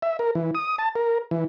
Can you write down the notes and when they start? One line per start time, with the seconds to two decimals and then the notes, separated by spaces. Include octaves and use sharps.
0.02 E5
0.19 A#4
0.35 E3
0.55 D#6
0.78 A5
0.95 A#4
1.31 E3